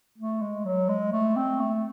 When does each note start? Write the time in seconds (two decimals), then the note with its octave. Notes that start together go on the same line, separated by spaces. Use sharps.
0.18 A3
0.41 G#3
0.65 F#3
0.89 G#3
1.13 A3
1.36 C4
1.60 A3